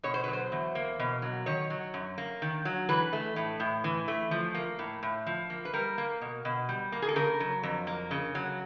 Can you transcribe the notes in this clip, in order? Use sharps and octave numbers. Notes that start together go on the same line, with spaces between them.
B2 C#5
C5
B4
F#3
C5
E2
A#3
B2
F#3
D#3 C#5
F#3
F#2
A#3
D#3
F#3
E3 B4
A3
A2
A2
E3
A3
F3
A#3
A2
A2
F3
A#3
B4
G3 A#4
A#3
B2
B2
G3
A#3
G#4
A4
C#3 A#4
F#3
F2
A#3
C#3
F#3